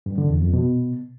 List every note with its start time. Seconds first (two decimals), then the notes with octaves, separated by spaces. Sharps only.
0.06 G2
0.18 D3
0.30 E2
0.42 F2
0.54 B2